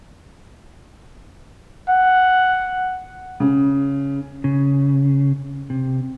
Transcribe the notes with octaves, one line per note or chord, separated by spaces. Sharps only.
F#5
C#3
C#3
C3